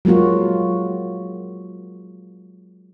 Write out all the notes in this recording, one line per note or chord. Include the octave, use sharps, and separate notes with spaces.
F#3 G#3 A#3 F4 F#4